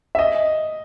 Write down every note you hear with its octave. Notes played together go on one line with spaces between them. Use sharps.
E5
D#5